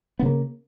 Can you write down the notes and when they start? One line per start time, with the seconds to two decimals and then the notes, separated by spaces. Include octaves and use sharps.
0.19 B3
0.22 C#3
0.25 A#3